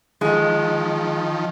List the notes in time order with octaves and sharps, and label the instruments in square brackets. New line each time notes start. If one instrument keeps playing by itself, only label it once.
[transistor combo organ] D#3 F3 [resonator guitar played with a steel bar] G#3